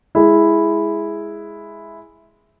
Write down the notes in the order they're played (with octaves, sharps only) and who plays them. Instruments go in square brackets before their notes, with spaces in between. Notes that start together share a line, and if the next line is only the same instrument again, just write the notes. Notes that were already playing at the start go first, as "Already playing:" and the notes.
[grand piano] G#3 E4